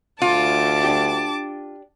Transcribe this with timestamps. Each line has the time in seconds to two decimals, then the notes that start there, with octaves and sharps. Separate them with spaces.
0.22 D2 F4 A5 D6
0.84 D4 G4